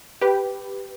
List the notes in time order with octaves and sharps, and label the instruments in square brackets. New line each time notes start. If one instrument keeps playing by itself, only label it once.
[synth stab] G4 B4